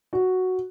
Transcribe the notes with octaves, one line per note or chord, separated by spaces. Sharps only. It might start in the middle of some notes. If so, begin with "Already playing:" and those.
F#4